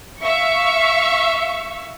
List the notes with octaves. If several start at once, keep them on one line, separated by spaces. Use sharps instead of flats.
E5 F5 C#6